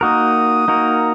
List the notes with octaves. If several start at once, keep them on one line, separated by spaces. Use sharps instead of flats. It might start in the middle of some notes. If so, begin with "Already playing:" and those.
A#3 D#4 F#4 A#4 D#6
A#3 D#4 F#4 A#4